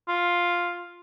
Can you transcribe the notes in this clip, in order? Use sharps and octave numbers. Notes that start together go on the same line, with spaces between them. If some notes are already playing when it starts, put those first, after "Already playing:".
F4